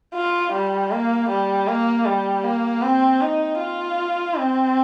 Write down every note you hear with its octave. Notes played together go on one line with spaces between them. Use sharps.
F4
G3
A#3
G3
A#3
G3
A#3
C4
D#4
F4
C4